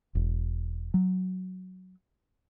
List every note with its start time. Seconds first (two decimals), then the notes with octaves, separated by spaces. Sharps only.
0.15 E1
0.94 F#3